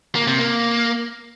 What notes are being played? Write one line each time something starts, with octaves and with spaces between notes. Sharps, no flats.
A#3
C3
A#3